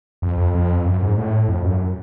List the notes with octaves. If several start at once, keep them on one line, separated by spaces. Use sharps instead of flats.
F2
F2
F2
F#2
G#2
A2
F2
F#2